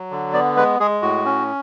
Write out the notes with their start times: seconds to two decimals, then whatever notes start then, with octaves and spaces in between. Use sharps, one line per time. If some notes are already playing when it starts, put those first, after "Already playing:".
Already playing: F#3
0.11 D3
0.33 B3 D5
0.56 G#3 B4
0.80 G#3 G#4
1.02 A2 F#4
1.25 C#4